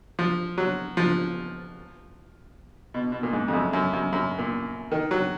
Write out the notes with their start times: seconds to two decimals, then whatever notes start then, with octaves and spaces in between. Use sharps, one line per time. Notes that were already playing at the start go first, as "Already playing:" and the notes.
0.19 F3
0.58 F#3
0.97 F3
2.94 B2
3.12 B2
3.23 A#2
3.33 G#2
3.48 F2
3.53 F#2
3.73 F#2
3.93 F#2
4.12 F#2
4.38 A#2
4.92 D#3
5.11 F#3